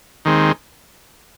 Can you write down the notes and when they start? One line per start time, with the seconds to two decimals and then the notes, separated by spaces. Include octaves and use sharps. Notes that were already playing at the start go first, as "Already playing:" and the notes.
0.25 D#2 D#3 G#3 C4